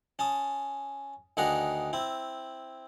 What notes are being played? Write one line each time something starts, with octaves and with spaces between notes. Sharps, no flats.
C#4 A5 D#6
D2 D#3 D4 G#4 F#5 A#5
C4 E4